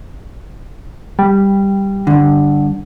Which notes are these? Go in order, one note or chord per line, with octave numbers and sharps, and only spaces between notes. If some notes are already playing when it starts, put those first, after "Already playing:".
G3
G2 D3